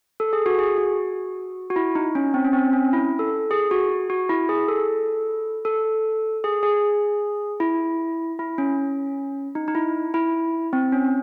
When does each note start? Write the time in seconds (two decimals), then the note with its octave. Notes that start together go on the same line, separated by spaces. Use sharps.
0.20 A4
0.33 G#4
0.46 F#4
0.59 G#4
0.78 F#4
1.70 F#4
1.76 E4
1.95 D#4
2.15 C#4
2.34 C4
2.44 C#4
2.53 C4
2.73 C#4
2.93 E4
3.19 A4
3.51 G#4
3.71 F#4
4.10 F#4
4.29 E4
4.49 G#4
4.68 A4
5.65 A4
6.44 G#4
6.63 G#4
7.60 E4
8.39 E4
8.58 C#4
9.55 D#4
9.68 D#4
9.75 E4
10.14 E4
10.73 C4
10.92 C#4